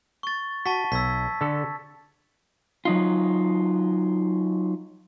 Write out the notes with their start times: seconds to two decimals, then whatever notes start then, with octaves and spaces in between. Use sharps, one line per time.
0.23 C#6 A6
0.66 F#4 A5 C#6 B6
0.92 B1 E6 G#6 B6
1.41 D3 A4
2.85 F#3 D#4 F4